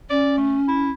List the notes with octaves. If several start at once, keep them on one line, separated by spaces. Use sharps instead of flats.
C#4 D5
A3
E4